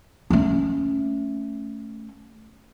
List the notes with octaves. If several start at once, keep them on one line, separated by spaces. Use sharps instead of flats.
A3 C#4